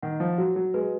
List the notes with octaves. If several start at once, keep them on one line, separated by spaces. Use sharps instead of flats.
D#3 F#5
F3
F#3 F#4
F#3
G#3 B4